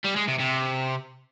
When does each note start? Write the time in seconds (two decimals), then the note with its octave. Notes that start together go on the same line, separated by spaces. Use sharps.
0.04 G3
0.16 G#3
0.28 C3
0.39 C3